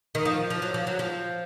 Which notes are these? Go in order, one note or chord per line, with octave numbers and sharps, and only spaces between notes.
D#3
F3
F3
F#3
F3
F#3
F3